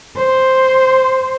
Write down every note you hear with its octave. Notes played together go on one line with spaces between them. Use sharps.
C5